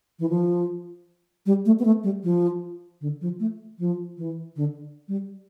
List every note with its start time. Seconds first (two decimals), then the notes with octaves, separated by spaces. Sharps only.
0.19 E3
0.30 F3
1.46 G3
1.66 A3
1.79 B3
1.85 A3
2.04 G3
2.24 F3
3.01 D3
3.21 F3
3.40 A3
3.79 F3
4.18 E3
4.56 D3
5.08 G3